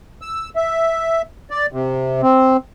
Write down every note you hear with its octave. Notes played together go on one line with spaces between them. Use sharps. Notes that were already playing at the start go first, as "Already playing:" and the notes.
E6
E5
D5
C3
C4